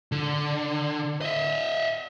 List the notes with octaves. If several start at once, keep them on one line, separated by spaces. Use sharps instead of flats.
D3
D#5 E5